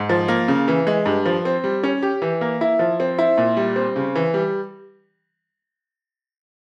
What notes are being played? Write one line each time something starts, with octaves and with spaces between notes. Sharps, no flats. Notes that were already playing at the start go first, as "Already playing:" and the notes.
Already playing: G#2
F3
A#3
C#3
E3
G#3
G2
F3
C4
G3
C#4
G4
E3
A#3
E4
F3
C4
E4
A#2
G3
C4
C#3
E3
G3